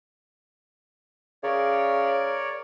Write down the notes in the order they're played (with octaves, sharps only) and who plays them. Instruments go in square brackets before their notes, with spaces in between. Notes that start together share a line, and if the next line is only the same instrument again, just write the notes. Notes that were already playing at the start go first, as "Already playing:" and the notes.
[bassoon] C#3 [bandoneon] A#4 C#5 D5